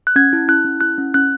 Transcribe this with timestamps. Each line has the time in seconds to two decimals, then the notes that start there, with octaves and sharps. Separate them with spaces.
0.07 F#6
0.16 C#4 G#6
0.33 E4
0.48 E4 F#6
0.65 C#4
0.81 E4 F#6
0.98 C#4
1.14 C#4 F#6